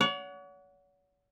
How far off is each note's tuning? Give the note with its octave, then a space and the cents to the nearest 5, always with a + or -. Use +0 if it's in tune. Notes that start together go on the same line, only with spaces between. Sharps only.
C#5 +40 F#5 -5